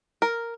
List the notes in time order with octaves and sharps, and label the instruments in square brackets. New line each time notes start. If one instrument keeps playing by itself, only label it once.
[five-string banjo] A#4